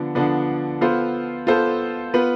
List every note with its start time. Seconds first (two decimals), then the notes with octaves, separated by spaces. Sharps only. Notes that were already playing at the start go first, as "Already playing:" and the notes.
Already playing: D3 F3 B3 D4
0.15 D3 F3 B3 D4
0.81 B3 F4 A4 C5
1.47 B3 F4 A4 C5
2.14 B3 F4 B4